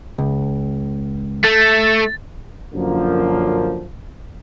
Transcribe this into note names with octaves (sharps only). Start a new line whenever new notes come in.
C#2
A3 A6
F#2 D3 F3 A#3